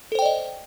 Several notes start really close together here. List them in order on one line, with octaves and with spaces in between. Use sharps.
A4 C5 G5 D5 D#5